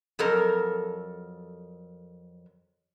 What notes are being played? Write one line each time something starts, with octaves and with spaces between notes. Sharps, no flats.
F2 F#3 A4 A#4